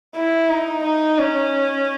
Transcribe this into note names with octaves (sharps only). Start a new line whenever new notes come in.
E4
D#4
D#4
C#4